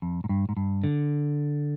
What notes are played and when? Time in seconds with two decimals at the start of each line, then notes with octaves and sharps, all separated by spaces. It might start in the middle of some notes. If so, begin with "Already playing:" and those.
0.02 F2
0.24 G#2
0.29 G2
0.49 G#2
0.57 G2
0.84 D3